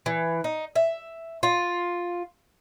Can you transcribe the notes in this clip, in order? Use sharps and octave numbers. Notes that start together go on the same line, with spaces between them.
E3
D#4
E5
F4